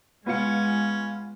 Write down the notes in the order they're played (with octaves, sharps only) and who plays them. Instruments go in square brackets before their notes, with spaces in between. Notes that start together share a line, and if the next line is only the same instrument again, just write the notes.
[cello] G#3 [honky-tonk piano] B3 F4 C#7 [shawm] C#4